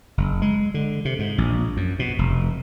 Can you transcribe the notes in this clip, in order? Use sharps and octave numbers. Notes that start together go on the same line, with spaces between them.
F#1
G#3
D3
C3
G#2
A#1
F#2
B2
F1